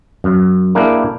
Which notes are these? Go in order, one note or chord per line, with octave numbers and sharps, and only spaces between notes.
F#2
A#3 D4 E4 G4 G#4 A#4